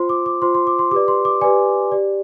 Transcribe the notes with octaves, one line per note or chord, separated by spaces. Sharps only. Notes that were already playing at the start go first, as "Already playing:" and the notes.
Already playing: F4 C5 C6
D6
D6
F4 C5 C6
C6
D6
C6
G4 B4 D5 D6
C6
D6
G4 B4 D5 G#5
G4 D5